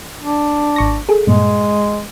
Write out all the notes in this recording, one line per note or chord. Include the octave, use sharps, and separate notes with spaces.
D4
G#1 C#6 A#6
G#4 A4
G2 A#2 G#3